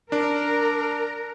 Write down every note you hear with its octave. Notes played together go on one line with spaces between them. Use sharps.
D4 A#4